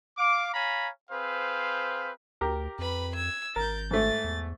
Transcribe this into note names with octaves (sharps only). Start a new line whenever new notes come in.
F5 D6
C#5 F5 G#5 A#5 B5
C4 G#4 B4 C5 F5
D2 G4 A#4
F2 B4 B5
E6 G#6
G#1 A#4 G6 A6
G#2 A3 A6
E2